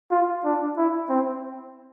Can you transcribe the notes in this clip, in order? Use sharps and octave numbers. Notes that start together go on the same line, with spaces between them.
F4
D4
E4
C4